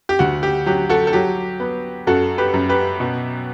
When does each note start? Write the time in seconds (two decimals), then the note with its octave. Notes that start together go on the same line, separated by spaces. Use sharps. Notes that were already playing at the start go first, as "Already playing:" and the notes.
0.09 G4
0.19 D2 F#4
0.43 G4
0.66 F#3 G4
0.89 F#4 A4
1.07 A4
1.13 F#3 G4
1.60 B3
2.07 F#2 F#4 A4
2.38 G4 B4
2.54 F#2
2.69 G4 B4
3.00 B2